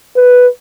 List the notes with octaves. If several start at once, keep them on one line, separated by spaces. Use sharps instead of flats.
B4